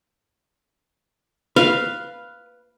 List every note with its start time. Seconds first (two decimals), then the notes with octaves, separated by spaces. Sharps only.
1.56 B4 F5